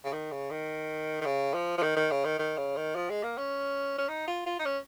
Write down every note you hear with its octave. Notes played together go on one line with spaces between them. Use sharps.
C#3
D#3
C#3
D#3
D#3
C#3
F3
F3
D#3
D#3
C#3
D#3
D#3
C#3
D#3
F3
G#3
A#3
C#4
C#4
D#4
F4
F4
D#4
C#4